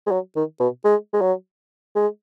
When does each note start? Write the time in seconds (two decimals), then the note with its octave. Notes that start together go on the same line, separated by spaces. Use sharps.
0.07 G#3
0.11 F#3
0.36 D#3
0.60 B2
0.85 G#3
1.14 G#3
1.21 F#3
1.96 G#3